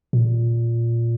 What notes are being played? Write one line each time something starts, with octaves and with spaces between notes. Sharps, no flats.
A#2